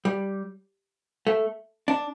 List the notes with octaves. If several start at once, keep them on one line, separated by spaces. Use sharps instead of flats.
G3
A3
D4